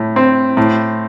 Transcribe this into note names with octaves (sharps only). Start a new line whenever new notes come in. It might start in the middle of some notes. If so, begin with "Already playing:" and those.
Already playing: A2
C4
A2